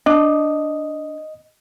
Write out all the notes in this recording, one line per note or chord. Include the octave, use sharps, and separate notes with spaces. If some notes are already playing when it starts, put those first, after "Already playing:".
D4 D#5